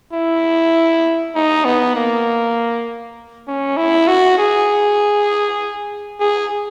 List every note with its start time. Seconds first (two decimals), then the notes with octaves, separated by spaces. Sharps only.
0.13 E4
1.35 D#4
1.65 B3
1.96 A#3
3.48 C#4
3.77 E4
4.08 F#4
4.38 G#4
6.20 G#4